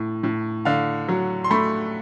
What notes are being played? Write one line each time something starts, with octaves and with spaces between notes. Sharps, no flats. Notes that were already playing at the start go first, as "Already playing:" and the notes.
Already playing: A2
A2
D3 F5
F#3
C6
A3 B5